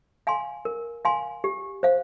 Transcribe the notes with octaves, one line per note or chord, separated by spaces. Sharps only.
F5 G#5 C6
A#4
F5 G#5 C6
G4
C5 F5